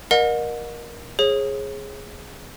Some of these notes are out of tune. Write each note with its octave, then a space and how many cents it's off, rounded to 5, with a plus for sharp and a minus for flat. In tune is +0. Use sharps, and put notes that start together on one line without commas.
A#4 +20 D#5 -25 F#5 -40
G#4 +0 C#5 -35